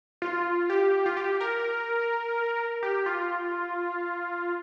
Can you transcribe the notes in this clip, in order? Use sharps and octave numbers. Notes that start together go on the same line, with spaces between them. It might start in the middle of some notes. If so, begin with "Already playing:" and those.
F4
G4
F4
G4
A#4
G4
F4